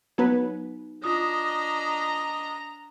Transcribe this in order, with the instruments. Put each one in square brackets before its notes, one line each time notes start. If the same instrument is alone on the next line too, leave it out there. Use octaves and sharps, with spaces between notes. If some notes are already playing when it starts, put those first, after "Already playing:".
[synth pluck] F#3 B3 B4 [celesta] D#4
[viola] D4 D#5 [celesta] F4 D#6 [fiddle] A#5